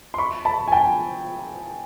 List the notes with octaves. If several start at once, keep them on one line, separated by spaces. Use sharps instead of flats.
C6
B5 C#6
A5 B5
G#5
G5 A5